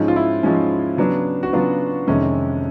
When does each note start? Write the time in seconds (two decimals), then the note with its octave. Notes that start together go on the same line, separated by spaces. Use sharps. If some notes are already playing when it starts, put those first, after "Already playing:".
Already playing: G#2 F3 G#3 C#4
0.08 F4
0.16 E4
0.43 G#2 F3 G#3 C#4
0.97 C#3 F#3 B3 D4
1.43 F#4
1.53 C#3 F#3 B3 D4 F4
2.07 F2 C3 D#3 G#3 C#4